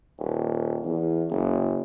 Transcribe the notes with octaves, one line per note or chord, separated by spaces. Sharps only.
D#1
E2
F#1